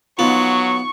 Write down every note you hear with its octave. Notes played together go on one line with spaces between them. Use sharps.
F#3 B3 D#4 F4 C#6